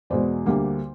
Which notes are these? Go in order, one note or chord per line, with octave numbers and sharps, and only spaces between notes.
E2 B2 G#3 C5 D5
D2 D3 G3 A#3